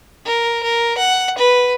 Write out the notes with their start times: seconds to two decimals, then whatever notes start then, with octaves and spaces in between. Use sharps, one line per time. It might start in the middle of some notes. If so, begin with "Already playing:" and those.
0.26 A#4
0.63 A#4
0.97 F#5
1.38 B4